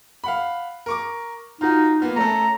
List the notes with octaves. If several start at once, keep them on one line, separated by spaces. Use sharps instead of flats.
F5 F#5 B5
A#4 C#6 D6
D#4 F4 F#4
A#3 B3 F4
A3 C#4 A4 A#5